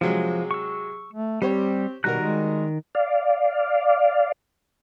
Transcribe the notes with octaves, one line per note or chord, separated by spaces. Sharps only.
C3 F3 F#3 G#3
C#6 E6
A3
G3 C4 G4 C5 C#5
B2 D#3 G3 F#4 A#4 A#5 F#6
G#3
D5 F5